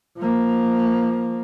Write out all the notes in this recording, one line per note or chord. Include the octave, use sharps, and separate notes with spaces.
F3 A#3